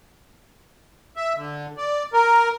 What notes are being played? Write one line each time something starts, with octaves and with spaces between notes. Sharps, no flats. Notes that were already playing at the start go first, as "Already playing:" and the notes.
E5
D3
D5
A#4